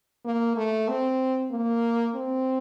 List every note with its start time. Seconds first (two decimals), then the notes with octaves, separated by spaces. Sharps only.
0.25 A#3
0.57 A3
0.88 C4
1.51 A#3
2.15 C4